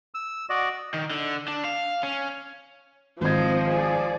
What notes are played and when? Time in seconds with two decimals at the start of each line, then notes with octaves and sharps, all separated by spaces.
0.14 E6
0.50 F#4 D5 D#5
0.94 D#3
1.11 D3
1.48 D4
1.65 F5
2.03 C#4
3.21 G#1 F3 C4 C5 D#5 G#6
3.70 G#4 D5